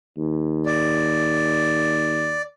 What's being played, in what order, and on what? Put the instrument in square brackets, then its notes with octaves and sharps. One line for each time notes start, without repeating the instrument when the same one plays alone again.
[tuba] D#2
[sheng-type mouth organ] D5